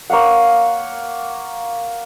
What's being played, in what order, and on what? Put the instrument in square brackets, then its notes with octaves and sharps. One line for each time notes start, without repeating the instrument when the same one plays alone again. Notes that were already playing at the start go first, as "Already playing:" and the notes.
[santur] A#3 C#5 F5 F#5